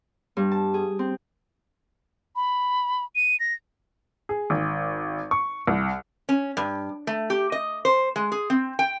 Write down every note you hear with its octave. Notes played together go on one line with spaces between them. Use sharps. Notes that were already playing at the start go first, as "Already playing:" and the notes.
G2
A5
G#4
C4
B5
D#7
A#6
G#4
G#1
C#6
C2
C#4
G2
A3
G4
D#5
C5
G#3
G#4
C4
G5